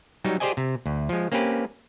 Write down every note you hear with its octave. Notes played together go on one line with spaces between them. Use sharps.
F#3 G3 D#4
G4 G#4 C5 D5 D#5 G#5
C3
D2
F3 G#3
A#3 C4 C#4 G4 B4